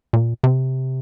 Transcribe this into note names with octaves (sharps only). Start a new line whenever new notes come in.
A#2
C3